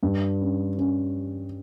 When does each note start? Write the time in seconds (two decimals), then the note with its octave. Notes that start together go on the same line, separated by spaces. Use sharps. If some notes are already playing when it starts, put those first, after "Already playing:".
0.03 G2
0.41 C#4
0.78 C#4